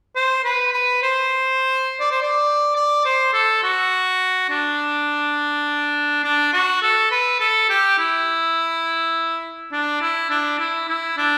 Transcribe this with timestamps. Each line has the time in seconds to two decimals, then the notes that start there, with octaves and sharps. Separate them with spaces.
0.16 C5
0.44 B4
0.73 B4
1.02 C5
2.00 D5
2.11 C5
2.22 D5
2.76 D5
3.05 C5
3.33 A4
3.63 F#4
4.50 D4
6.24 D4
6.53 F#4
6.82 A4
7.11 B4
7.40 A4
7.69 G4
7.98 E4
9.72 D4
10.01 E4
10.30 D4
10.59 E4
10.88 E4
11.17 D4